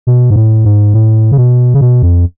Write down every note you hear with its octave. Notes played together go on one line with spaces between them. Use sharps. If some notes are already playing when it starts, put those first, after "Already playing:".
B2
G#2
A2
G#2
A2
C#3
B2
C#3
B2
F2